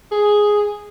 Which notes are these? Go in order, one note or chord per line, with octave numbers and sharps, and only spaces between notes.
G#4